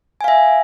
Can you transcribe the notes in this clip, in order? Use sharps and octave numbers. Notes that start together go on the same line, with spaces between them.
E5 F5 G#5